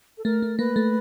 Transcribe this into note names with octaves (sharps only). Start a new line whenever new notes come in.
A4
A3 A#4
A3
A#3 B4
A3